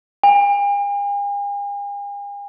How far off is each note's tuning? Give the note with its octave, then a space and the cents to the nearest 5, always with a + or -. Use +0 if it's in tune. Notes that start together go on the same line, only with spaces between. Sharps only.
G#5 -45